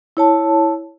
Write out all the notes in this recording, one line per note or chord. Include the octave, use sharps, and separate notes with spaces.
E4 C#5 A5